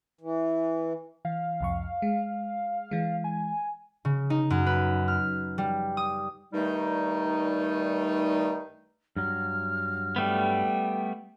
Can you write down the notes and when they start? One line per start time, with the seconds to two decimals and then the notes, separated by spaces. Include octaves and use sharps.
0.21 E3
1.25 E3 F5
1.61 C2 F2 C#6
2.02 G#3
2.91 E3 G#3
3.24 G#5
4.05 C#3
4.30 D#4
4.50 F#2
4.66 B4
5.08 F6
5.58 G3
5.97 D#6
6.53 G2 D#3 G3 A3 D#4
9.16 G2 F#3 F6
10.16 G3 A3 B3 G5